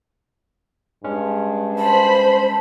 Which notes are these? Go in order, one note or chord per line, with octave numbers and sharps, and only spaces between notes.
G2 G#3 C#4
C5 A5 B5